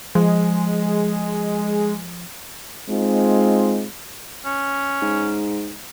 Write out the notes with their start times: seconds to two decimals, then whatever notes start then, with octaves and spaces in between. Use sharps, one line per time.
0.15 F3 G#3
2.89 G#3 C4 D#4 F4
4.46 C#4
5.02 G#2